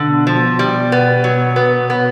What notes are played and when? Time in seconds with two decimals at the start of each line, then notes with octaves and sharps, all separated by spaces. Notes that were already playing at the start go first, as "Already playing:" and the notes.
Already playing: B2 D3
0.27 F3
0.59 G3
0.92 B3
1.24 F#3
1.56 B3
1.90 B3